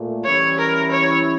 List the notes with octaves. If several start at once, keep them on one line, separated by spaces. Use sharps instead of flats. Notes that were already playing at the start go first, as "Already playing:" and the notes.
Already playing: A#2 A3
E3 G3 C#4 E4 C#5
A#4
C#5